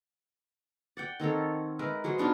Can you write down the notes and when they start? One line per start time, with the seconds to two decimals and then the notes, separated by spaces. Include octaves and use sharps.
0.97 D5 F#5 G5
1.20 D#3 C4 A4 C#5
1.79 G#3 A#4 B4 E5
2.04 F#3 G#4 B4 C5
2.18 B3 D4 D#4 F4